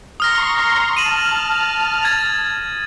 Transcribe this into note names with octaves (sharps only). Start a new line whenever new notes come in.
A#5 C6 C#6 D#6 F6 A#6
A5 F6 D#7 E7 F#7
G#6 A6